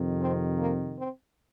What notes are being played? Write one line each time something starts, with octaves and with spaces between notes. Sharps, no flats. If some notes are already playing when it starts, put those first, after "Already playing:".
Already playing: F2 C3 D#3
C4
A#3
C4